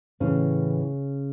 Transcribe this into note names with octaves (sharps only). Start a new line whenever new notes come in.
A2 C#3 E3 C#4